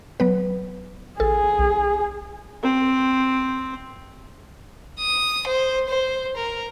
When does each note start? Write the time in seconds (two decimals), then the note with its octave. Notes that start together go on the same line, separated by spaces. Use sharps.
0.20 F#3 B3 B4
1.20 A1 G#4 A4
1.59 B1
2.63 C4
5.00 D#6
5.47 C5
5.89 C5
6.37 A#4